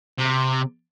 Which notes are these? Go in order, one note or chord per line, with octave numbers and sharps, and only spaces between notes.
C3